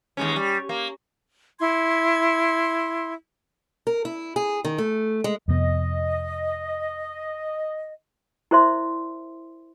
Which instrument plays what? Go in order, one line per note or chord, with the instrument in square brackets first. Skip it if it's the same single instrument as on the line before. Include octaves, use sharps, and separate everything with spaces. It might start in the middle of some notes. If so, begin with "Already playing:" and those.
[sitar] D#2 G#3 C#4
G3
A#3
[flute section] E4 C6 G#6
[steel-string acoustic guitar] A#4
E4
G#4
D#3
A3
G#3
[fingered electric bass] F2 C3 B3 [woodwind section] D#5
[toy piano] E4 A#4 C5 D5 E5 C6